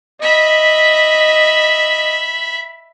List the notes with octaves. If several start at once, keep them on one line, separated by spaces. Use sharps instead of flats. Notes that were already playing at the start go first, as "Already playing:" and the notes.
D#5 E5 B5